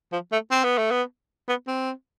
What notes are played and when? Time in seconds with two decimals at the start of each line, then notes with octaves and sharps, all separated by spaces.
0.12 F3
0.32 A3
0.51 C4
0.64 B3
0.78 A3
0.91 B3
1.48 B3
1.67 C4